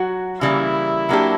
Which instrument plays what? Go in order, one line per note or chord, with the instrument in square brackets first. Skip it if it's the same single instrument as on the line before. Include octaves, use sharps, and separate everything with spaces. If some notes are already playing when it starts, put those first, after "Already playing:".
Already playing: [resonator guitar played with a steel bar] F#3 F#4
[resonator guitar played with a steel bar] C#3 E3 G3 A#3 [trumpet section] E4
[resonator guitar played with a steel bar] F#3 A#3 D4 G4